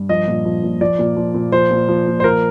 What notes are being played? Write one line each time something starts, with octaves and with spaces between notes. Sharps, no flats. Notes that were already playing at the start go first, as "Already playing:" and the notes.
Already playing: G2
F3 D#5
A#2
F3
A#2
F3 D5
A#2
F3
A#2
F3 C5
A#2
F3
A#2
C5
F3 A#4